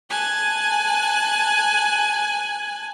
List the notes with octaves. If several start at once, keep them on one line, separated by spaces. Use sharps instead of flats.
G#5 A5 F#6